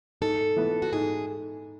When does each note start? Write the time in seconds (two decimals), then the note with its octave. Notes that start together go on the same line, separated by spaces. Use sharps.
0.21 G#2 A4
0.56 E3 B3
0.82 F#4
0.93 G#2 G#4